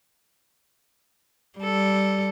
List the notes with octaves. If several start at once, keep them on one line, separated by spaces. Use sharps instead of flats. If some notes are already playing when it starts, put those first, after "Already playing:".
G3 A4